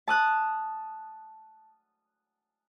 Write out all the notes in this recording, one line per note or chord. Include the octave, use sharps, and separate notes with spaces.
A5 D#6 F#6